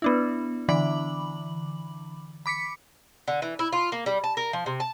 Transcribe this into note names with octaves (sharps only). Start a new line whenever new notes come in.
B3 D4 E4
D3 E3 B5 D6 F#7
B5 D6 B6 C#7
D3
E3
E4
F4
A#3
G3
A5
A#4
F3
C3
A5